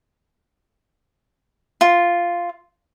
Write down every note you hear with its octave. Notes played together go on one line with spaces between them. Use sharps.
F4